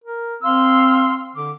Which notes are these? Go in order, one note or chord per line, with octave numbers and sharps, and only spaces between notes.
A#4
C4 F5 C6 E6
D3 D6